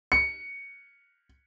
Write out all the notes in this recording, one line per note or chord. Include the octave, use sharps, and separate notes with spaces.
C#7